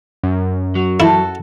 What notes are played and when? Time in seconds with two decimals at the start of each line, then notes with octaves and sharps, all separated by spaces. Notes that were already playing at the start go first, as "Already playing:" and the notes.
0.23 F#2
0.75 F#3
1.00 E4 F#4 A4